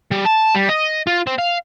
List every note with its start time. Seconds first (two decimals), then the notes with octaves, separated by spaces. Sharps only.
0.11 G3
0.25 A5
0.55 G3
0.69 D#5
1.07 F4
1.27 C4
1.38 F5